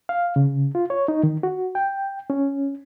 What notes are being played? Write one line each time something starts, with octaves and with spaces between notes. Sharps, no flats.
F5
C#3
F4
C#5
D#4
D#3
F#4
G5
C#4